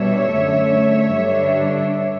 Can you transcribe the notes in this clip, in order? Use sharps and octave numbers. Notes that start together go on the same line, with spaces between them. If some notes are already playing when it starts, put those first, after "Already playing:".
Already playing: B2 G3 D4 C#5 E5
F#2 D3 A3
G2 D3 G3 D4